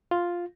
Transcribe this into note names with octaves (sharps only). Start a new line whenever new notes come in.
F4